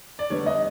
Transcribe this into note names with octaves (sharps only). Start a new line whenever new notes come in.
D5
D3 G3 B3 C#5
D#5